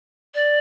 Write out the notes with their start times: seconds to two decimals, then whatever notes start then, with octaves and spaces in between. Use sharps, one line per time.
0.34 D5